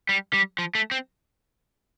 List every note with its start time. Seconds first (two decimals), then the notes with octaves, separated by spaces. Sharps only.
0.09 G3
0.33 G3
0.59 F3
0.75 A3
0.91 C4